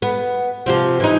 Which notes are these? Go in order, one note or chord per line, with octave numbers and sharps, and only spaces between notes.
B3
C3 F3 C4
E3 D#4